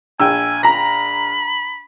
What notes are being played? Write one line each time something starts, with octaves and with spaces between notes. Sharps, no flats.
A#1 G5 G#5 E6
A#5 B5 A#6